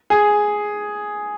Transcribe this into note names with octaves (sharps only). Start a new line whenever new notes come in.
G#4